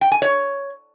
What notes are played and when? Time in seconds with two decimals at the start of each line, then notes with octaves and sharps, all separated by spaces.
0.01 G5
0.12 G#5
0.22 C#5